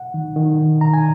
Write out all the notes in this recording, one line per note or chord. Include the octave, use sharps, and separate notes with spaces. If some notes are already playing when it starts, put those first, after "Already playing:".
Already playing: F#5
D#3
D#3
D#3
D#3 A#5
G#5